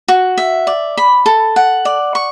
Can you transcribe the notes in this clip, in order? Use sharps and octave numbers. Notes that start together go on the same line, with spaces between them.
F#4
E5
D5
B5
A4
F#5
D5
C#6